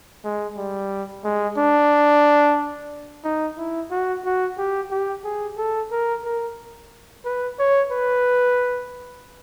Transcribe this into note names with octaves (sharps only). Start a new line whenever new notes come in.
G#3
G3
G#3
D4
D#4
E4
F#4
F#4
G4
G4
G#4
A4
A#4
A#4
B4
C#5
B4